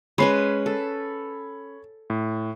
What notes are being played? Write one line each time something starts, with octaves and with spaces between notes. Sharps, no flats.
G#3 C#4 B4 C#5 B5 C7
A4
A2